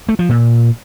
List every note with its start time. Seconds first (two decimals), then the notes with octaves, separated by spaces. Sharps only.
0.09 A3
0.19 F3
0.29 A#2